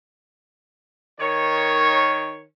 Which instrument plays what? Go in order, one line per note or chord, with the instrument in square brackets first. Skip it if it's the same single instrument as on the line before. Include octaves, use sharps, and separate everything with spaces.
[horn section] D#3 C#5